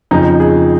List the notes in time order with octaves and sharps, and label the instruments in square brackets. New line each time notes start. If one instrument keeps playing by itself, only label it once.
[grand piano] F2 C#3 F3 D#4
G#4